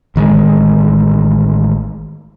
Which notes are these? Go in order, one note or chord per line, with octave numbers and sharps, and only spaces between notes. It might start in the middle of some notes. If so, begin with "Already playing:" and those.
A1 D#3 F#3 G#3